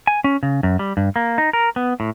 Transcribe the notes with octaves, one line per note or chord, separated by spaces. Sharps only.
G#5
C#4
C#3
F#2
G3
G2
A#3
D#4
A#4
B3
A2